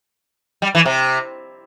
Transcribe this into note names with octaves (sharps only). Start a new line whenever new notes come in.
G3
E3
C3